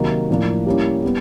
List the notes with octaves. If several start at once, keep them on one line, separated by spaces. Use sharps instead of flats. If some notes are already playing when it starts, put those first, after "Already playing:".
Already playing: C3 D#3 F#3 A#3 D#4
A2 F3 A#3 D4
G3 A#3 C#4 E4
G3 B3